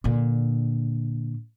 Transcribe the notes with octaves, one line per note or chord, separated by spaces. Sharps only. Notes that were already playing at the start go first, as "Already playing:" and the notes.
A#2 D3